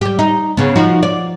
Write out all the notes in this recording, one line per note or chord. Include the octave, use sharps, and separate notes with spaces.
G3 G4
D#4
C#3 B3
F3 D#4 F#4
D5